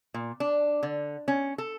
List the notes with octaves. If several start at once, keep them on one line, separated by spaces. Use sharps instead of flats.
A#2
D4
D3
C#4
A4